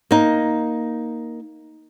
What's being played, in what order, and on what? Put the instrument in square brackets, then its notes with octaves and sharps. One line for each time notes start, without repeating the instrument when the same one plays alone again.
[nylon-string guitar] A#3 D#4